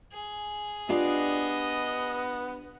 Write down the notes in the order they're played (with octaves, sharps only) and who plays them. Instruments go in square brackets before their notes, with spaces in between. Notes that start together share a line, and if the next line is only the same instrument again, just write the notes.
[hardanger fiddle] G#4
[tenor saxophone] B3 [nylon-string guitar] D4 F4 G4 [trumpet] D#5